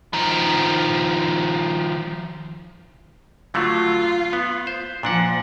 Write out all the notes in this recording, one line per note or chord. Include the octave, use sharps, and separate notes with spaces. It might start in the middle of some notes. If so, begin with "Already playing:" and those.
D#3 F3
D3 F#3 A3 F4
B3
C5
A#2 F3 D4 F#5